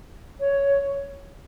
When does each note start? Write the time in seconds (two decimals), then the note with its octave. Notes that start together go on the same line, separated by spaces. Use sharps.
0.40 C#5